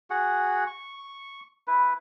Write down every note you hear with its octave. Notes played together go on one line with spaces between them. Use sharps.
F#4 G#4 F#5
C#6
E4 B4